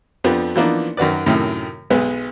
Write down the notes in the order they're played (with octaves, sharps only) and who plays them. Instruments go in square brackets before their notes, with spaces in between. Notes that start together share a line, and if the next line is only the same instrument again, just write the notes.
[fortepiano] F2 F3 B3 D4
E3 F3 A#3 B3 D4 D#4
F#2 D#3 F#4 B4 D5
F#2 A2 C3 D#3
B1 G#3 B3 B4